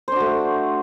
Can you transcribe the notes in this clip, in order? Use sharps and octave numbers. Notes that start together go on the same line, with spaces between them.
A3 D4 F#4 C5